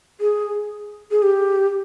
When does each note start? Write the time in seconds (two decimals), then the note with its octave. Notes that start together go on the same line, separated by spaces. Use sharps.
0.21 G#4
1.11 G#4
1.23 G4